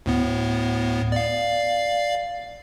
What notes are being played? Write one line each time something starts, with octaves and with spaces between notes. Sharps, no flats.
D2 A2 B3
D5 F5